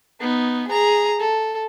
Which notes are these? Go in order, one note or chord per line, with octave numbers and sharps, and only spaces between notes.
B3 D#4
G#4 A#5
A4